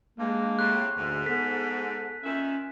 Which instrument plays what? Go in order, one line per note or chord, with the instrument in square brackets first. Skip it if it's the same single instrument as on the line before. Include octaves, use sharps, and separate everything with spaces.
[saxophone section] G2 [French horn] G#3 [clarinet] A#3
[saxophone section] A2 C3 [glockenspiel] F#6
[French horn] D2 [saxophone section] G#2
[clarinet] B3 [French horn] A4 [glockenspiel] B6
[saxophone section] A#2 D#3 E5 [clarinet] C#4